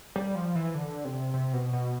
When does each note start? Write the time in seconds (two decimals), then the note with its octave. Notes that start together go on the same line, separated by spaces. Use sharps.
0.16 G3
0.35 F3
0.55 E3
0.75 D3
1.05 C3
1.34 C3
1.53 B2
1.73 B2